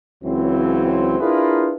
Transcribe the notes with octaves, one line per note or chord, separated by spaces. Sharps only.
C#2 E3 F#3 C4
D4 E4 F4 G#4 A#4 B4